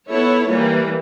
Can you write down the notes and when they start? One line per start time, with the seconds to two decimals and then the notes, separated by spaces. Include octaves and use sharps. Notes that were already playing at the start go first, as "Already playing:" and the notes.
0.09 B3 E4 A4 C#5
0.48 E3 G3 A#3